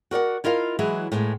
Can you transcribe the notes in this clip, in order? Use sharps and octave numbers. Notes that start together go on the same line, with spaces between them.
F#4 A#4 D5 F#5
E4 F4 A#4 D#5 F5
E3 F#3 G#3 E4 G#4
A2 G#3 B3